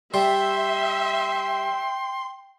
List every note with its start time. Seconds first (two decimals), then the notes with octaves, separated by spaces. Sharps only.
0.14 G3 E5 G5 C6